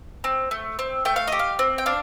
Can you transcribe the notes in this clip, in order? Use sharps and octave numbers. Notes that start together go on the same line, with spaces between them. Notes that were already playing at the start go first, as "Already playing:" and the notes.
C4
A3
C4
A3 G5
F5
G4 D#5
F5
C4
G5
D4 F5